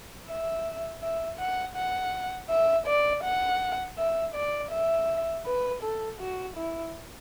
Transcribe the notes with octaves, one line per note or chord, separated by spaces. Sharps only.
E5
E5
F#5
F#5
E5
D5
F#5
E5
D5
E5
B4
A4
F#4
E4